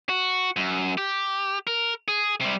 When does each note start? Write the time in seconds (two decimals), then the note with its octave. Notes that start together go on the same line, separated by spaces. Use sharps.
0.09 F#4
0.56 F#2
0.98 G4
1.67 A#4
2.08 G#4
2.41 C3 G3